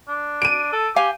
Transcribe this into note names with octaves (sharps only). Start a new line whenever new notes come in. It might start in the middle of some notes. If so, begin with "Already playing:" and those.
D4
D7 D#7
A4
G4 F5 G#5